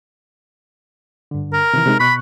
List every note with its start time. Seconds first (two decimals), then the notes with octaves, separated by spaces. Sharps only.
1.31 G2 D3
1.53 A#4
1.74 C3 D#3 E3
1.86 C3 G#3 D#4
2.00 B2 B5 C#6 F#6